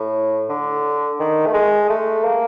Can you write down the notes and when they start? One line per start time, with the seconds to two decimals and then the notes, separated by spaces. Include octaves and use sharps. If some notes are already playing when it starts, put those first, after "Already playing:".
Already playing: A2
0.49 D3
1.19 D#3
1.46 A3
1.54 G#3
1.90 A3
2.25 A#3